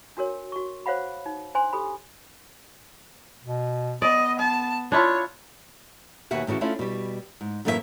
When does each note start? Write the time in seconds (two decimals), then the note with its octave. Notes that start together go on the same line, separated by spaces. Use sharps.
0.17 D4 F#4 A#4 C#5
0.52 F#4 C#6
0.86 C5 C#5 F5 F#5 B5
1.26 D#4
1.55 D4 C5 G#5 C6
1.73 G4 A4 B5
3.44 B2
4.02 B3 D5 D#5
4.39 A5
4.92 D4 E4 F4 C#5
6.31 D#2 B2 E5 F#5 G#5
6.47 A2 C#3 E3 F#4
6.61 A3 C#4 D4 E4 F4
6.79 B2 G3
7.41 G#2
7.65 F#2 A2 E3 A#3 G#4 E5